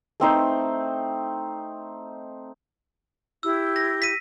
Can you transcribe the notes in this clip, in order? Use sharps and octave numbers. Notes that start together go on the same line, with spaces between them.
A3 C4 D#4 C5
E4 G4 E6
A#6
B6 D#7